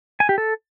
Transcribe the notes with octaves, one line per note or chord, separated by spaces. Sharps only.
G#5
G4
A4